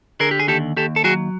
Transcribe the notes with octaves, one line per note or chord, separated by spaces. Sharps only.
D3 G#4 A#4
G4
G#4
D#2 G4 A4
D#2 G4 A4
A4
F#3 F#4 G#4